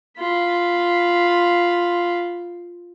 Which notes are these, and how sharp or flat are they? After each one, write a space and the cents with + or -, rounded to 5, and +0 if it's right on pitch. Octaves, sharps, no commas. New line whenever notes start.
F4 +0 B5 +0